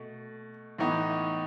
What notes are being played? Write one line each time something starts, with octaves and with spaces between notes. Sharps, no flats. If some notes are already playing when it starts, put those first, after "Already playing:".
Already playing: B2 A3
A2 E3 B3 D#4